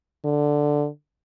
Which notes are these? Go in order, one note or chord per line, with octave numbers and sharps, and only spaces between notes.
D3